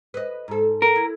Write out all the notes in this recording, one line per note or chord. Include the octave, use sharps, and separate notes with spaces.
B4 D#5
G#2 A4
A#4
E4